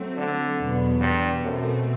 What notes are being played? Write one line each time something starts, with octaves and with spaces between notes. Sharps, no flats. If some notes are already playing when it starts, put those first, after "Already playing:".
Already playing: F#3 A3 C4
D3
E2 B2 F#3 B3
G2
F#2 B2 A3 C4